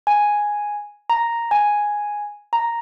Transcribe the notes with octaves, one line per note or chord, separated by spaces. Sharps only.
G#5
A#5
G#5
A#5